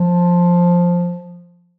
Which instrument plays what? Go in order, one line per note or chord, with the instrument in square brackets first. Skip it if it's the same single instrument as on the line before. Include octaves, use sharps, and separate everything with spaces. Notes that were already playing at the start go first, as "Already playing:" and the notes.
Already playing: [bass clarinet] F3